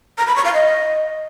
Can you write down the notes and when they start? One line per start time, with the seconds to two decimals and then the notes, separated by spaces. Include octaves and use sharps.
0.18 A#5
0.27 B5
0.36 C#6
0.45 F5
0.54 D#5